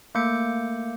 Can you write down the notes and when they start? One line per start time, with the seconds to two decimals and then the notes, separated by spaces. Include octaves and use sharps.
0.15 A3 A#3 D6 G6 C#7